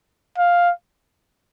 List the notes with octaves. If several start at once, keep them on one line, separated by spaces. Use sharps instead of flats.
F5